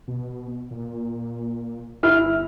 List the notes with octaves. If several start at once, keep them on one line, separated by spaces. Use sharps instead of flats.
B2
A#2
G1 E4 F6